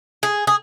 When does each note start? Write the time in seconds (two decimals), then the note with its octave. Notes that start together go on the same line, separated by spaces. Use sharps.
0.23 G#4
0.47 G#4